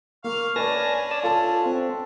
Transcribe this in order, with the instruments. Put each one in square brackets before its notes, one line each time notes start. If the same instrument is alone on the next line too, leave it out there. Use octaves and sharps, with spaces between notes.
[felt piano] A#3 [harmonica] F5 C#6 F6
[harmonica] C#4 D4 [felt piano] B4 D5 [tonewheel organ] G#5 A5 A#6
[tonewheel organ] D5 A5 E6
[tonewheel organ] F4 [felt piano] A4 A5
[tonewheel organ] C4